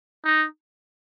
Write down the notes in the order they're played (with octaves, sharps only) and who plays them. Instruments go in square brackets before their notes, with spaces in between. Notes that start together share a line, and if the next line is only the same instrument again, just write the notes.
[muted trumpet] D#4